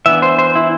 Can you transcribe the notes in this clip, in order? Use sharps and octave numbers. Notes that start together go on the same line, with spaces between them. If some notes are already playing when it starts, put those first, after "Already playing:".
E3 B3 D4 E5
C5
C5
E4